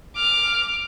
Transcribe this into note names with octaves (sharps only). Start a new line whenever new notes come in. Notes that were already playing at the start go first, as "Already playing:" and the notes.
D6 F6